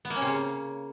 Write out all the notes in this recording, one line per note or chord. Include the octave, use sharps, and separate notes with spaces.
B3
A#3
C#4
C3
C#3